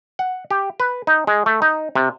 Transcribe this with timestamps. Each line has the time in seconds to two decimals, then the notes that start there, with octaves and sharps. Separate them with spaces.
0.19 F#5
0.51 G4
0.80 B4
1.07 D#4
1.27 G#3
1.46 A3
1.62 D#4
1.95 C3